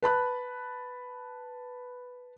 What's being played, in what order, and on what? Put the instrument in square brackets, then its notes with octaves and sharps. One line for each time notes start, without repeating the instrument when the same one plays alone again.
[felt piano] B4 A5 B5 F#6